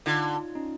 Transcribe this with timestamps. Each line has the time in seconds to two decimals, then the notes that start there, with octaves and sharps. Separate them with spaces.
0.06 D3 D#4 F4
0.55 C#4 D#4